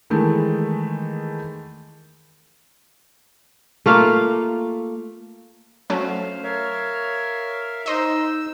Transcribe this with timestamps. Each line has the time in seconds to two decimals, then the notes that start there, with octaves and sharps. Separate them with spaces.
0.10 D#3 E3 G#3 A3
3.86 A3 A#3 F4 F5
5.90 F#3 A3 C#4 C5 F5
6.43 A#4 C#5 E5 F5
7.86 D#4 C5 D#5 E6